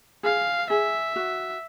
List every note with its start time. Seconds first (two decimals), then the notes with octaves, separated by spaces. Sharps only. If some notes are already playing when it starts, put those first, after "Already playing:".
0.23 G#4 F5
0.70 G#4 E5
1.16 F#4